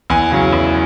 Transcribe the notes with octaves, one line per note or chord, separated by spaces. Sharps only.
E2 G#5
C#3 F#3
E2